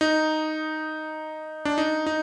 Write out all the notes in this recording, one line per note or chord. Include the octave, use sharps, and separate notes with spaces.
D#4
D4
D#4
D#4